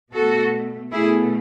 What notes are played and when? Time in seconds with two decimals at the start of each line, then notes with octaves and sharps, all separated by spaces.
0.12 B2 A3 F#4 A4
0.92 B2 A3 E4 G#4